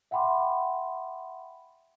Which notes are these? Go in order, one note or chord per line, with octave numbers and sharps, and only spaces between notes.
E5 F#5 G5 B5 C6 D6